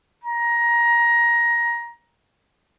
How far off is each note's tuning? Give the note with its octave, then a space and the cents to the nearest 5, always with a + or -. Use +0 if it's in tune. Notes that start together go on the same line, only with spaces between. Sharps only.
A#5 +15